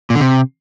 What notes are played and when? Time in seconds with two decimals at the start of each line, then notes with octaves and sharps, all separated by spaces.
0.10 A#2
0.15 D3
0.20 C3